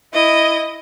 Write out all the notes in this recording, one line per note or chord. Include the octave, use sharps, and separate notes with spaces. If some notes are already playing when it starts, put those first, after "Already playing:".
E4 D#5